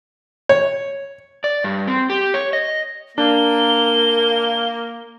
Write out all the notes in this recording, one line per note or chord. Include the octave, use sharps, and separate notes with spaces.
C#5
D5
G2
C4
G4
C#5
D#5
A#3 D4 G7